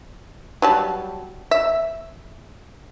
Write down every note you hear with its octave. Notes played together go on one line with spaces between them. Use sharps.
F#3 G3 A5
E5